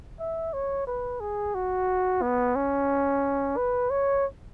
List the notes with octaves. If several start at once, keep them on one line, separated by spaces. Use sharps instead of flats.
E5
C#5
B4
G#4
F#4
B3
C#4
B4
C#5